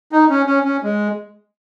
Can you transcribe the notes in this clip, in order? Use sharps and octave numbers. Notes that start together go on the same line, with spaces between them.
D#4
C#4
C#4
C#4
G#3